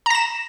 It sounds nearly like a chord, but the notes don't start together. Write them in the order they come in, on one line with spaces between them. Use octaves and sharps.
A#5 A#6 E7